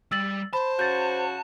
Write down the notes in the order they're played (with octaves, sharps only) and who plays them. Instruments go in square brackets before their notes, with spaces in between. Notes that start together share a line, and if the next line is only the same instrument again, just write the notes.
[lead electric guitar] G3 [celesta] E6 A6 F#7
[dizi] C5 [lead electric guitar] A5 [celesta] B5
[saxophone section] C#3 F#4 [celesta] G6 A6